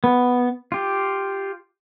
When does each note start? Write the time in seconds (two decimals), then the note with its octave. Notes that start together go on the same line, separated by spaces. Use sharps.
0.04 B3
0.72 F4 G4